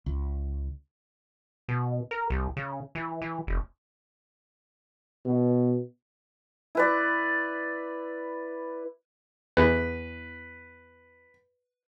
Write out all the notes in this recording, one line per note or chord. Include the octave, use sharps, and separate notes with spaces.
C#2
B2
A#4
C2
C#3
E3
E3
F1
B2
E4 B4 D5
E2 B4